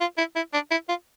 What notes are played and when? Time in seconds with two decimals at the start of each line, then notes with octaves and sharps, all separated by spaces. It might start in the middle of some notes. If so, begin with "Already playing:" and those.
0.01 F4
0.18 E4
0.36 E4
0.54 D4
0.71 E4
0.89 F4